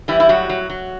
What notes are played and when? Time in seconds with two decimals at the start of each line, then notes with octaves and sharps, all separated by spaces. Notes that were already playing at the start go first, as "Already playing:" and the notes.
0.08 E3 G3 E4
0.20 E4
0.29 A2 F#3 F#4
0.49 F#3
0.70 F#3